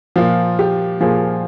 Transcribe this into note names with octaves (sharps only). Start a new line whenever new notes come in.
A#2 F3 F4
G4
A#2 F3 G#4